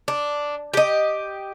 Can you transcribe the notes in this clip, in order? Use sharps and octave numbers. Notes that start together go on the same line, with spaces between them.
D4
G4 D#5